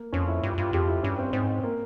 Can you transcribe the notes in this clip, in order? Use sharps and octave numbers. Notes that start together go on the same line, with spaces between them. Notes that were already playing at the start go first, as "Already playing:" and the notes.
Already playing: A#3
F2 C#4
E4
G2 F4
G2 F4
F2 G4
E4
G2 C#4
C4
G#2 C4
A#3